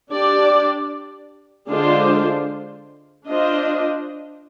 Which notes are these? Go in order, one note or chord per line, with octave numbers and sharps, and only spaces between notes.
D4 G4 D5
D3 G#3 D4 F4 C5
D4 F4 C5 D#5